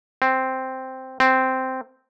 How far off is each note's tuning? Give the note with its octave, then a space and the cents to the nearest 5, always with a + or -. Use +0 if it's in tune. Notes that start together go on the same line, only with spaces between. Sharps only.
C4 +0
C4 -5